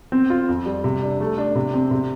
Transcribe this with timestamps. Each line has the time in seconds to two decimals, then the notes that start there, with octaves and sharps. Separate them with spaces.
0.12 C4
0.30 F4
0.49 F2
0.66 G3
0.84 C3
1.02 D4
1.20 A3
1.38 D4
1.56 C3
1.74 C4
1.91 C3